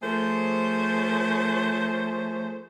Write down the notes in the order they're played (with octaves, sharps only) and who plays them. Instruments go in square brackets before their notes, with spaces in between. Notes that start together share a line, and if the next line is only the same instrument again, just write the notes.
[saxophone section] F3 A3 G#4 A#4 C5 C#5